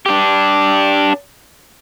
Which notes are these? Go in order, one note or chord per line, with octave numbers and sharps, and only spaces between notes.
D4 G4